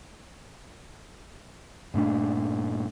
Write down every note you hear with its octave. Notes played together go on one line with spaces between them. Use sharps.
G2 A#2 A3 D4